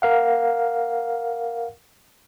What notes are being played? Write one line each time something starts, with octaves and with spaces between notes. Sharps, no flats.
A#4 F5 F#5